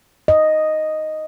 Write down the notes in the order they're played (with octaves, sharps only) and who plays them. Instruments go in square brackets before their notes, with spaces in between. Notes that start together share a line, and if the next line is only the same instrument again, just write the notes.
[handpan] D#5